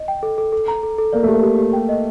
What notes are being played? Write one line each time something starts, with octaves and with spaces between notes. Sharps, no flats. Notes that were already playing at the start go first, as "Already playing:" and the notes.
Already playing: D#5
G5
A4
A4
A4
A#5
A4
A4
A#3 D5
A3 G4
A#3
G4
G4
G5
D#5